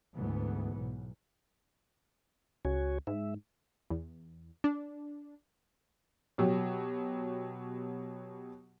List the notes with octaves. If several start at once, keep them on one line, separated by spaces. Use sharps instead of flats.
D2 G#2 E3 B3
B1
C#2 F#4 C#5 G#5
G#2 G#3 E5
E2
D4
B2 F#3 G4